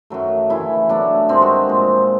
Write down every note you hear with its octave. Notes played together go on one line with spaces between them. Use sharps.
F#2 D#3 F#3 A3
C#3 E3 A3 E4
B2 F#3 A3 D4
G2 D#3 G#3 C4
F#4
A#2 F3 G#3